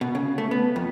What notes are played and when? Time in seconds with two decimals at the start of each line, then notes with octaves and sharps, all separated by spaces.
0.01 B2
0.15 C#3
0.38 A3
0.51 B3
0.76 F2